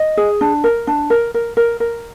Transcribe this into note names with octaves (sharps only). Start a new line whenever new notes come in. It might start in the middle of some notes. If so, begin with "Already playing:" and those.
Already playing: D#5
G#4
D4
A#4
D4
A#4
A#4
A#4
A#4